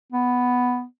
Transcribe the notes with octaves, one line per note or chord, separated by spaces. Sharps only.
B3